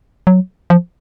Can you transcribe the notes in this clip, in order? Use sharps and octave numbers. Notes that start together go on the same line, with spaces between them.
F#3
F3